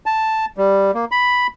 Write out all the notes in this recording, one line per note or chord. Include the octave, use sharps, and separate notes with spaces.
A5
G3
A#3
B5